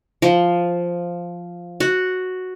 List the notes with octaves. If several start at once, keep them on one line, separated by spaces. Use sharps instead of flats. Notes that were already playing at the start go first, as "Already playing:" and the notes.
F3
F#4